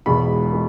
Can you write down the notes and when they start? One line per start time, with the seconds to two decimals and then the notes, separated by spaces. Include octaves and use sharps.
0.06 E1 E2 B2 G#3 B5
0.53 G#3